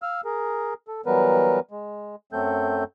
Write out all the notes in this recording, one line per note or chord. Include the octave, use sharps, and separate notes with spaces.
F5 E6 F6
G#4 A#4
A4
E3 F#3 G3 B3 A#4 B4
G#3
F#2 F#3 A3 C4 A4 G6